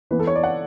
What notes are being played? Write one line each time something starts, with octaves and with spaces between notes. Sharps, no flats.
E3 B3 B4
A4
C#5
D5
F#5